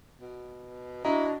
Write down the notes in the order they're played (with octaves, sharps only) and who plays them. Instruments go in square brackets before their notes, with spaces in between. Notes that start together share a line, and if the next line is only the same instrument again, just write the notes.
[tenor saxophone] B2
[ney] D4 [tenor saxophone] E4 [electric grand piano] F#4 D#5 A#5